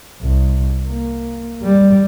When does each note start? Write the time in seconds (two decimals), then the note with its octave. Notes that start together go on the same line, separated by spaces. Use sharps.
0.22 C2
0.88 A#3
1.63 G3